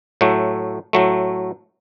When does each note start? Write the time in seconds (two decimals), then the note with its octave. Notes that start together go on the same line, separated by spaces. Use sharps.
0.21 A2 F#3 A3
0.93 A2 F#3 A3